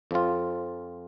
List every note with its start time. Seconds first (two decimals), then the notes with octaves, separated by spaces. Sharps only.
0.11 F2 F3 C4 F4